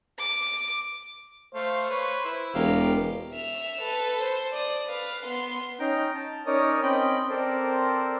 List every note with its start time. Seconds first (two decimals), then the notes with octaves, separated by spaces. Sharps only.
0.18 D6
1.55 A3 C5 F5
1.89 B4 C#5
2.25 E4
2.55 E1 G4 A#4 F5
3.34 E5 F7
3.81 A4 B4
4.21 C5
4.52 D5 D#6
4.86 B4 F5
5.26 B3 C6
5.80 C#4 D#4 G5 A#5 G6
6.15 A5
6.46 C#4 D#4 A#4 C#5 D5 D#6
6.82 C4 C#4 D#5 G5 B5 G6
7.30 C4 A4 A#4 C5 D5